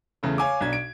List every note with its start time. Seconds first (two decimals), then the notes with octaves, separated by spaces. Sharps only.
0.23 E2 C#3 A3
0.38 C#5 F5 G#5 D6
0.61 B1 D4 G#6
0.73 D7